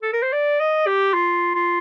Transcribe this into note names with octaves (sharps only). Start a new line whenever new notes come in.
A4
A#4
C5
D5
D#5
G4
F4
F4